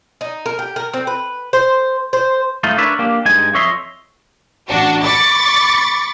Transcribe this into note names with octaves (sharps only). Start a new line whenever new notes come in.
D#4
A#4
G4
A#4
C4
B4
C5
C5
A2 A3 D#4 F4
D4 A#4 B4 C#5 D5 E5
A#3 D4 G4
G2 G#3 D#4 G#5
F2 C#5 D#5 E5 C6
A1 D4 F#4
B5 C#6 D6 A6